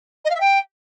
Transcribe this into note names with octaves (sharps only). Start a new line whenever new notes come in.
D#5
F5
E5
G5